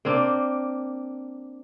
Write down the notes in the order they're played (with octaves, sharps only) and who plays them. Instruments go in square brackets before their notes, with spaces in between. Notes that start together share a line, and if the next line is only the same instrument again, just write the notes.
[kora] A#3 C4 D4 D5